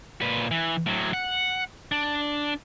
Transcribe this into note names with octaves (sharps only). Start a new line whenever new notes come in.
A#2 B4
E3
A2 F#3
F#5
D4